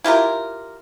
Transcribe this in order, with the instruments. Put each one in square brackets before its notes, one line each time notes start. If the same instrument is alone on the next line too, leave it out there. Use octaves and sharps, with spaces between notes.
[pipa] E4 F4 G4 A#4